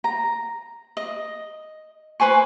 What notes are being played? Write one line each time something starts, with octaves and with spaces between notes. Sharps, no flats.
A#5
D#5
B4 C5 G#5 C#6